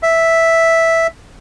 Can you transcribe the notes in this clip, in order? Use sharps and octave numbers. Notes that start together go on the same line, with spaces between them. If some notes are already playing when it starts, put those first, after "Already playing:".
E5